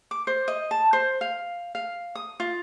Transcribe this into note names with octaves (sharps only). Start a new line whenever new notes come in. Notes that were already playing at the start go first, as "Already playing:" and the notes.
D6
C5
D#5
A5
C5
F5
F5
D#6
F4